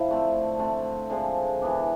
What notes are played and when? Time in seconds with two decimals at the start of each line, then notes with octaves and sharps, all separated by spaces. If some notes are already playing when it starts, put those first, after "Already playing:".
Already playing: F3 E4
0.08 D3 A3 C4
0.59 D3 A3 C4
1.10 D3 F3 G#3 C4
1.62 E3 B3 D4